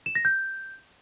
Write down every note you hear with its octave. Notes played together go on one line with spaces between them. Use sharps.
E7
A#6
G6